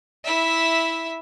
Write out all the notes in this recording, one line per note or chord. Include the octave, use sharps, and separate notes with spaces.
E4 E5